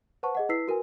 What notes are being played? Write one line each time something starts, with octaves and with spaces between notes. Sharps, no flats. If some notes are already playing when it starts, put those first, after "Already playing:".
B4 C5 F#5 A5 C#6
G#4 D#5 F#5
E4 B4 E6 B6 C7
F#4 A#4 B4 G#5